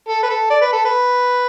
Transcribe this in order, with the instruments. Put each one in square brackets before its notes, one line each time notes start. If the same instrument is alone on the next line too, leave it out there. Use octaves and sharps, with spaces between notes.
[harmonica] A4
B4
A4
D5
B4
A4
B4